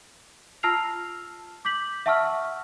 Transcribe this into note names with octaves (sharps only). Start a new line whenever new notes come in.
F4 A5 E6 F6 C7 F7
D6 G6 B6 F#7
E5 F#5 A5 C#6 E6 F6